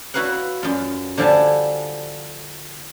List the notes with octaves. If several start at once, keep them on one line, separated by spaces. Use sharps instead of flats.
E4 F#4 B4 F5 F#5
F#2 F4
D3 F3 G3 F5 G#5 A5